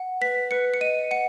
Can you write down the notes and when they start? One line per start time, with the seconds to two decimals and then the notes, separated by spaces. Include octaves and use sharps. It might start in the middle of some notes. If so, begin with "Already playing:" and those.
Already playing: F#5
0.21 B4 B6
0.51 B4 C#7
0.74 C#7
0.81 D#5 D#7
1.11 F#5 C#7